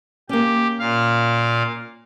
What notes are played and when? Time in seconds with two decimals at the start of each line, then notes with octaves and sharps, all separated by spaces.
0.29 A#3 C#4 G4
0.79 A#2 F5